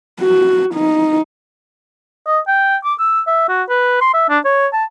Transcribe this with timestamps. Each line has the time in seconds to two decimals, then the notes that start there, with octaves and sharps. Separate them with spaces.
0.21 F#4
0.75 D#4
2.26 D#5
2.48 G5
2.84 D6
2.99 E6
3.27 E5
3.49 F#4
3.70 B4
4.01 C6
4.14 E5
4.30 D4
4.45 C#5
4.73 A5